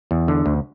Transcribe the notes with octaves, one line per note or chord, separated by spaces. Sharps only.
E2
D3
D2